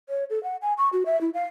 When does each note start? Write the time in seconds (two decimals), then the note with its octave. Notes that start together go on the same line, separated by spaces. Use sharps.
0.09 C#5
0.30 A4
0.44 F#5
0.62 G#5
0.78 C#6
0.93 F#4
1.06 E5
1.21 E4
1.34 F5